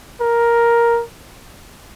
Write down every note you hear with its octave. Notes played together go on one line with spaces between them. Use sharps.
A#4